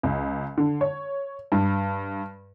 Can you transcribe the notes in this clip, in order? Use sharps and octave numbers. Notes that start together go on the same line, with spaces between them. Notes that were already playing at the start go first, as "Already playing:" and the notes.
C#2
D3
C#5
G2